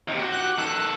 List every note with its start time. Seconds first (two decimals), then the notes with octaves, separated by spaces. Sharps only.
0.08 D#2 C3
0.19 F#4 G4
0.32 F#6
0.58 D#3 A4 F#6